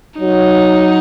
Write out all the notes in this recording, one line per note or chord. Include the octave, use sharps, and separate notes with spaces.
F#3 D#4